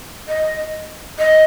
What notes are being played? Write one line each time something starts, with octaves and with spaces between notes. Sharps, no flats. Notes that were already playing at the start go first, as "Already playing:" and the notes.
D#5
D#5